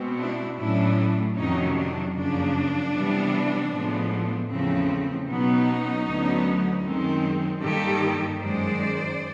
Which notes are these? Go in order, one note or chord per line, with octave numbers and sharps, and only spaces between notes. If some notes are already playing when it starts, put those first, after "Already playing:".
Already playing: B2 G#3 C4
D4 E4
A2 F#3 A3 C#4 D4 E4
F2 C3 D#3 F#3 C#4 D#4
D4
F#2 C#3 F3 A#3 D4
C3 E3 G3 B3
A2 F3 G#3 B3
E2 C#3 F3 A3 C4
B2 F#3 B3 C#4 D#4
D2 D3 F#3 B3
F#2 D#3 G#3 C4
G2 D#3 G3 A#3 G4 A4
F#2 D#3 G#3 C5 D5